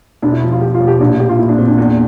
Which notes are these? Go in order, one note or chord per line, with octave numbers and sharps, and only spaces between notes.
E1 D4
E4
F3
F4
E1 G4
F4
E1
G4
A#1 D4
E4
A#1 G4
F4
A#2 E4
D4
A#2 C4
D4
E2